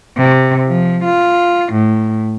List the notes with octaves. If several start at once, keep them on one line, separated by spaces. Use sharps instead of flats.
C3
F3
F4
A2